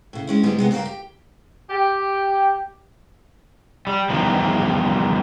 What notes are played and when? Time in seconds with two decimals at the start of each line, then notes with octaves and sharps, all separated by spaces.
0.13 A2 C#3
0.27 G#3 C#4 E4
0.43 G#2 D3 G3 G#3 B3 D#4
0.59 C3 G#3 B3
0.71 G2 C#3 A#4 F5 G5
0.85 G4
1.70 G4
3.87 G3
4.09 E2 G2 D#3 F3